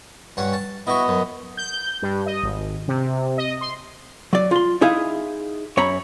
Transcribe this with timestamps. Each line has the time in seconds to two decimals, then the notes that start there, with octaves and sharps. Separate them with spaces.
0.37 G2 C#4 F#5
0.53 A5
0.87 B3 E4 F#4 D#5
1.08 F#2
1.57 G6
2.02 G2
2.26 D#5
2.43 G#1
2.88 C3
3.38 D#5
3.61 C6
4.33 F#3 D5
4.51 F4 C6
4.81 D#4 E4 G#4 E5 F5
5.77 F#2 C#5 A#5 B5